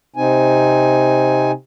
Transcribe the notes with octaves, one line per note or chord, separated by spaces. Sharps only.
C3 C4 D#4 G#5